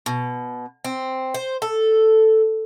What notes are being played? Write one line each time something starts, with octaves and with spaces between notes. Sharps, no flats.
B2
C4
C5
A4